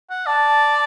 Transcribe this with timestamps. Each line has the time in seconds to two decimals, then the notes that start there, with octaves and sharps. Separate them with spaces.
0.10 F#5
0.26 D5 A5